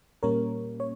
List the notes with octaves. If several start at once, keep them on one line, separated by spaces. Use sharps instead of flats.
A#2 G3 A#3 C#4 A#4 C#5
C#5